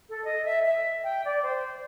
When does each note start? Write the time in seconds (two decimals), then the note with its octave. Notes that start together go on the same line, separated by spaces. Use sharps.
0.10 A4
0.24 D#5
0.45 E5
0.65 E5
1.04 G5
1.25 D5
1.43 C5